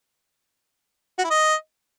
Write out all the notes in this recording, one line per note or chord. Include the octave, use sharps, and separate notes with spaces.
F#4
E4
D#5